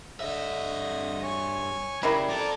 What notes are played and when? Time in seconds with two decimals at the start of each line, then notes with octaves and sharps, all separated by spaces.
0.20 G2 D3 D#5 E5 D#6
1.23 C#5 G#5 C#6
2.03 C#3 G3 A#3 E4
2.29 F3 A4 D5 A#5 D6